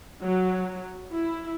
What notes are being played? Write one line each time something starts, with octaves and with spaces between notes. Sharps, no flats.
F#3
E4